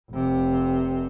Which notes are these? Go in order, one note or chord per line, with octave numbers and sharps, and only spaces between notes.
F1 C3